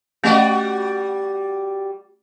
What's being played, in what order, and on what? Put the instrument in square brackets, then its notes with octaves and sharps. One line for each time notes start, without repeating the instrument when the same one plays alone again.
[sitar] G3 F#4 D5 [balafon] A3 C#4 D#5